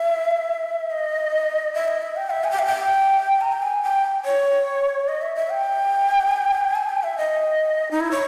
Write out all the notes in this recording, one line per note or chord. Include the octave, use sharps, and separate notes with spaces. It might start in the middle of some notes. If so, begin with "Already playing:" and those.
Already playing: E5
D#5
E5
D#5
E5
G5
E5
G#5
G5
E5
G5
A#5
G5
G#5
G5
C#5
D#5
E5
E5
G5
G#5
G5
E5
D#5
D#4
E4
C#5